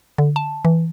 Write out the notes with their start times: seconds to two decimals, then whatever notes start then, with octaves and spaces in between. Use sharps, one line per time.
0.18 D3
0.36 A5
0.65 E3